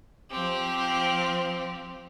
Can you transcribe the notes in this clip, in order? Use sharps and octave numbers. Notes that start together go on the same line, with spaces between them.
F3 C4 G4